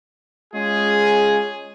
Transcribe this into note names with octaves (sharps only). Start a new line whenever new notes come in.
G#3 C#4 F4 G#4